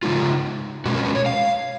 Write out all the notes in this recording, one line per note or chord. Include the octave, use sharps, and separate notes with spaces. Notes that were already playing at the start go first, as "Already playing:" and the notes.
C#3 G#3 D#4 F4
B2 G#3 C#4 F#4
A#4
B4
C#5
F5